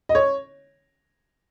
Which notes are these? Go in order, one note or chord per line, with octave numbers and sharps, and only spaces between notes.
D#5
C#5